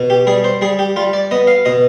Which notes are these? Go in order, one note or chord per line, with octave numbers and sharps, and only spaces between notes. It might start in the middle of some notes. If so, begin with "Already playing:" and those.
Already playing: B2
G4
G3 G#4
C5
G3 G#4
G4
G3 F4
D5
B3 D#5
F5
B2 D#5